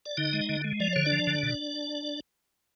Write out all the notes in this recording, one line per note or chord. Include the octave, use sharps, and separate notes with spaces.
D5
D3 D#4 D#5
G#3
D3
G#3
F3 D5
D3 C#5
D4 D5
F3
D3
B2